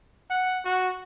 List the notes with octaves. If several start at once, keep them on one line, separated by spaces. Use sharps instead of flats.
F#5
F#4